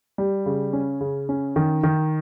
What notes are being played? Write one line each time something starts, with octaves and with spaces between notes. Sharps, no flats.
G3
C#3
C#4
C#3
C#4
D#3
D#3